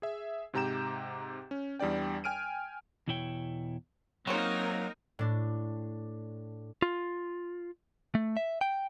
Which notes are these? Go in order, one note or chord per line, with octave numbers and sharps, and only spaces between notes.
G#4 E5
G#2 C3 G4 A#5 G6 E7
C#4
E2 G3 D4 D5 G5
G5 G#5 F6 D7 D#7
E2 B2 E4 C#5 G5
F#3 A#3 C4 C#4 D#4 F4 A#4 C#5
A2 D4
F4
A3
E5
G5